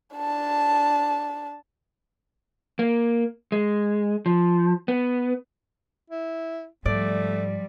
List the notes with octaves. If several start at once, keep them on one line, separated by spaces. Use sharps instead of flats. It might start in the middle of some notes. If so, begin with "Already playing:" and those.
D4 A5
A#3
G#3
F3
B3
E4
G#2 F3 G3 A3 D5